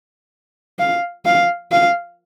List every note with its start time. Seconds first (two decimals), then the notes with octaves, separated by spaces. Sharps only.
0.79 F5
1.26 F5
1.72 F5